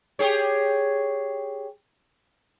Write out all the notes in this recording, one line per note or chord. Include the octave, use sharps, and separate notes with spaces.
G4 G#4 C#5